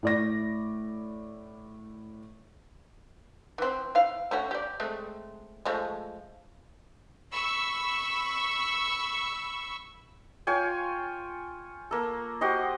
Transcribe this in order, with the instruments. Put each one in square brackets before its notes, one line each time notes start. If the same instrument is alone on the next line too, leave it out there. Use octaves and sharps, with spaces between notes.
[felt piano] A2 D5 A#6
[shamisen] E3 C4
E4 F5
A3 C#4 F#4
G4 D5
G#3 A3 C4
F3 G#3 A3
[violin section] B5 C#6 E6
[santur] F4 C#5 G5 G#5
A#3 A4
F#4 G4 C5 D#5